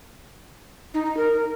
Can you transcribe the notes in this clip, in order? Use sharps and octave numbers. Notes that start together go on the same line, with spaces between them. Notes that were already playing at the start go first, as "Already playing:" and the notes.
D#4
D#4
A#4